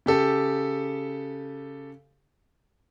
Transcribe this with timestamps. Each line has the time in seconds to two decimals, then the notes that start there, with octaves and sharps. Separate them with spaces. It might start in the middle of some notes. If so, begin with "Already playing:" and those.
0.06 C#3 G4 A4